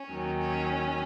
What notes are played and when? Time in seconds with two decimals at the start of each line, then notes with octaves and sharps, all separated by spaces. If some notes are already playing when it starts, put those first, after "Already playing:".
Already playing: C#4
0.11 D#2 D#3 F#3
0.39 C#4